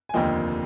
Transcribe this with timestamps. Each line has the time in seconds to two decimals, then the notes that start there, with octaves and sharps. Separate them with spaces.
0.09 G#5
0.14 F1 D#2 D3 F3 A#3 D#5 G5